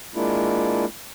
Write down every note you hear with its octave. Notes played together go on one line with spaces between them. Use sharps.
G#3 A#3 D4 E4 F4